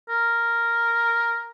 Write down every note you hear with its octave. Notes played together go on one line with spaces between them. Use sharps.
A#4